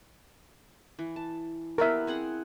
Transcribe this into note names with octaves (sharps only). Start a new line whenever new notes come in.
E3
A5
G3 B3 E4 A#4 E5
C4 G#4 F#5